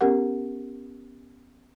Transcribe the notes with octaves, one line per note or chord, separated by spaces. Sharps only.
B3 C#4 G4 A#4 F#5